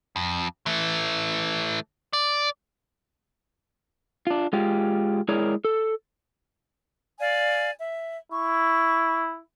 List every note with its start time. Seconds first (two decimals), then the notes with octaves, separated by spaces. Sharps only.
0.16 F2
0.66 E3 A3
2.13 D5
4.27 D4 F4
4.53 G#3 F4 G4
5.28 G#3 E4 G#4 A#4 C#5 D5
5.65 A4
7.19 D5 F5 G#5
7.79 E5
8.32 E4 C#6